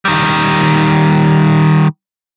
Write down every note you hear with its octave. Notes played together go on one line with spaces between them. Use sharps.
D#3 G3